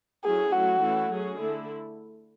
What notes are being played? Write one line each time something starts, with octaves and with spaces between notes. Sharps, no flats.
F#3 A3 C#4 E4 G#4
F#3 A3 E4 F#4
E3 A3 C#4 E4
F#3 C#4 G#4
D3 A3 E4